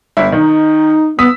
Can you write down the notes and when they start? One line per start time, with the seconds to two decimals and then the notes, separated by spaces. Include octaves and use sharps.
0.17 G1 E4
0.32 D#3 D#4
1.19 B3 D#6 E6 B6